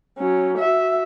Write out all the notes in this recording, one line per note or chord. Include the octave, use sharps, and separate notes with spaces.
F#3 C#4
F#4 E5